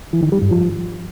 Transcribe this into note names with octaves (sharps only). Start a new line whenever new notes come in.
E3
D#3
G3
G2
F3